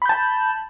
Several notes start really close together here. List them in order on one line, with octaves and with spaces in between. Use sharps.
B5 G6 A5